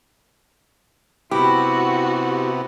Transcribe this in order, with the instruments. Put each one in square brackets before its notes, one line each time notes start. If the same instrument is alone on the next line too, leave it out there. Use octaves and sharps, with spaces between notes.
[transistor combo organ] C3 B3 [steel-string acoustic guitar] E4 [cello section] F#4 [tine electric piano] G4